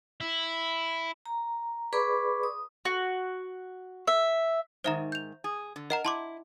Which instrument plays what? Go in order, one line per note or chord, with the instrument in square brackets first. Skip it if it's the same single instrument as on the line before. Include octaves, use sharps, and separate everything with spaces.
[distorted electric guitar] E4
[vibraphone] A#5
G#4 B4 D5 B5 C#6 D6
D#6
[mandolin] F#4
E5
[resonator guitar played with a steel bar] G#2 D#3 [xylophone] C5 E5 A#5
[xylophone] G6 F7
[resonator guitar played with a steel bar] G#4
D3
[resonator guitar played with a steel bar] A#4 [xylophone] D#5 F#5 A#5
[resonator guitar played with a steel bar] E4 [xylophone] A5 C6 D6